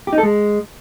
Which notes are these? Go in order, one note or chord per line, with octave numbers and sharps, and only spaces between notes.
G4
D#4
A4
G#3